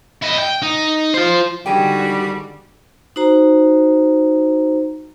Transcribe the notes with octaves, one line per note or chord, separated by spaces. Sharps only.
E4 D#5
G5
D#4
F4 C5
G#2 D3 D#3 G3 F#4 G#4 G5
D#4 F#4 C5 A#5